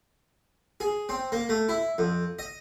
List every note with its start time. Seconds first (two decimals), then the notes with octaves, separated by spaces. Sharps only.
0.80 G#4
1.09 C4
1.32 A#3
1.49 A3
1.69 E4
1.98 F2
2.39 D#5